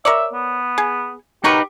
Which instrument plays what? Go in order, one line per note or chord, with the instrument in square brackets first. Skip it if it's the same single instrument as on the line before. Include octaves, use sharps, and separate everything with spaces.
[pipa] A#4 C#5 D5 [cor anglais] E5
[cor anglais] B3
[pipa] G#4
[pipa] F#3 A#4 C#6 [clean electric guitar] D#4 B4 [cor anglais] G4